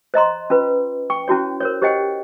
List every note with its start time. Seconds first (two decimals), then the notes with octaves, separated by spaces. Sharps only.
0.14 C5 D#5 A#5 C6
0.50 C#4 F4 B4
1.10 G5 C#6
1.28 C#4 E4 F#4 C#5
1.61 A#4 C5 C#5
1.82 G4 C5 C#5 D#5 F#5 G5